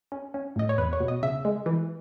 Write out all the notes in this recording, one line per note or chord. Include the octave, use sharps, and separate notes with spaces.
C#4
C#4
A2 D#5
C#5
E2 B4
C#5
B2
D#5
C#3 E5
G#3
E3